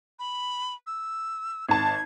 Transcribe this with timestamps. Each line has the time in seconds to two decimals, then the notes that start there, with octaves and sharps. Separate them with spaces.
0.19 B5
0.87 E6
1.69 G#1 A5 G#6